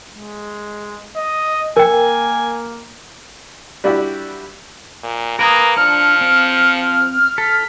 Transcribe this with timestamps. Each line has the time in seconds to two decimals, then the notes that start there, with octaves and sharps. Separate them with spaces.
0.13 G#3
1.16 D#5
1.77 A#3 A#4 G5 G#5
3.84 G3 D4 E4 F#4 G4
5.03 A#2
5.39 A#3 A#4 B4 G#5 A#5 D#6
5.77 F3 D4 F6 C#7
6.21 C4
7.38 A4 B6